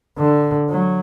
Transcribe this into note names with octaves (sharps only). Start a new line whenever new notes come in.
D3
F#3